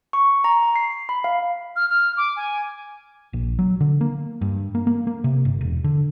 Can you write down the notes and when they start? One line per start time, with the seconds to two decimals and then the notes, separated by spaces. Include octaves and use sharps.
0.13 C#6
0.44 A#5
0.76 C7
1.09 B5
1.24 F5
1.76 F6
1.90 F6
2.17 D6
2.36 G#5
3.33 A#1
3.59 F#3
3.80 D3
4.01 A#3
4.41 G2
4.75 A#3
4.87 A#3
5.07 A#3
5.24 C3
5.45 G1
5.61 E1
5.84 D3